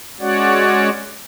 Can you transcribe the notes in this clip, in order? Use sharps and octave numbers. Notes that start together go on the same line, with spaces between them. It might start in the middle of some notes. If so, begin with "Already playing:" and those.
G#3 C#4 F#4 C#5 D5 F#5